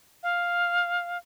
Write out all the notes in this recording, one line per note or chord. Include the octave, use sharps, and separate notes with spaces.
F5